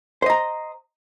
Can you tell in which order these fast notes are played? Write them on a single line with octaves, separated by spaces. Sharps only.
C5 D#5 A#5